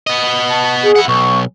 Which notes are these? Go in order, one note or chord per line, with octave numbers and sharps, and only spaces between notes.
B3 D#5
A5
G#4
E4 F#5
B1 C#6